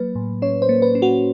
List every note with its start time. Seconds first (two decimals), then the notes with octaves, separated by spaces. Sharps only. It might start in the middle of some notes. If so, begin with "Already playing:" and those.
Already playing: F#3 A#3 B4
0.15 A2
0.42 C#4 C#5
0.62 C5
0.69 A#3
0.82 B4
0.95 C#4
1.02 F#4